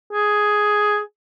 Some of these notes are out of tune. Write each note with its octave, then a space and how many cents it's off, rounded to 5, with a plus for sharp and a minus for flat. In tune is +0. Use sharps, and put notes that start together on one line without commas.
G#4 +5